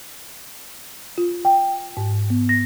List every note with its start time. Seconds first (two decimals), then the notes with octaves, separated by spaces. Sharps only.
1.18 F4
1.45 G5
1.97 G#2
2.30 B3
2.49 A#6